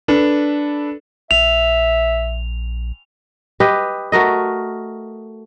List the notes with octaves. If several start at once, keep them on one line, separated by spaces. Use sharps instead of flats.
D4 A4 B4
A#1 E5 F7
G4 B4 D#5
A3 F#4 A#4 D#5